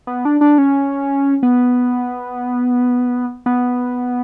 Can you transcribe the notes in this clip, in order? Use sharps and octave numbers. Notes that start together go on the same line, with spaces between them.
B3
D4
D4
C#4
B3
B3